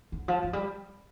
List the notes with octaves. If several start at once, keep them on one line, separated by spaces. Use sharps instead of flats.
D3
F3
F3
G3